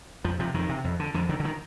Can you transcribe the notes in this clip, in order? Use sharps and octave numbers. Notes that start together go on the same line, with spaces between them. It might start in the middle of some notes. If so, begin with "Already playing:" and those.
F2 F3
C3 F3
F2 D#3
C3
F2
D3
F2 D3
D3 D#3
D3
D#3